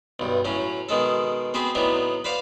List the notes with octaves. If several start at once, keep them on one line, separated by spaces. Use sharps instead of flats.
B1 G2
A2 F#3 C#4
B2 D#3 G#3 A4
B3 C4 F#4 G#4 B4
A2 F#3 B3 D4 D#4
B4 C5 D5 F5 F#5